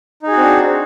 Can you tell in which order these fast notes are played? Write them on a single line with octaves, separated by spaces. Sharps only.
D#4 G#4 F#4 C4 D4